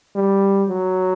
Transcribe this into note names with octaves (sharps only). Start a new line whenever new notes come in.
G3
F#3